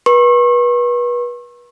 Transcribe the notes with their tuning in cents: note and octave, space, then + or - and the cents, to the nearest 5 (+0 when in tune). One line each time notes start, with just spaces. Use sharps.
B4 -35 C#6 -40